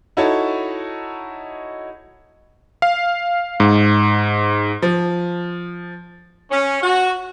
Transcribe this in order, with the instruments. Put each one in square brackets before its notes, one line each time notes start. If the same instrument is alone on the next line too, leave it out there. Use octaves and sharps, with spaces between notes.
[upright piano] D#4 E4 F#4 A4 C#5 A5
[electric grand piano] F5
G#2
[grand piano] F3
[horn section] C#4
F#4